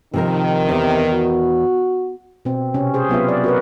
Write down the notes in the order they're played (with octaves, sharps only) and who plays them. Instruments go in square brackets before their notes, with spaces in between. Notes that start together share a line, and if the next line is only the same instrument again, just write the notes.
[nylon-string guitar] C3 F3 A#4 [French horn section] D#3
[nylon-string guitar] E2 [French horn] C3
[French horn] F#4
[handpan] B2 C4
C3 C#4
G#4 C5
F#3 B3 F4 E5
D5
F#4 A#4 B4